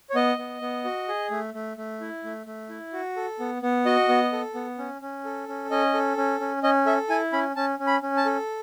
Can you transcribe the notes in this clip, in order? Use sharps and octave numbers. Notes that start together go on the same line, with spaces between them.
C#5
B3 D#5
B3
B3
F#4
G#4
A3
A3
A3
E4
A3
A3
E4
F#4
A4
B3
B3
F#4 D#5
B3
A4
B3
C#4
C#4
A4
C#4
C#4 D#5
A4
C#4
C#4
C#4 D#5
A4 E5
E4 G#5
C#4 B5
C#4 A5
C#4
B5
C#4
A5
A4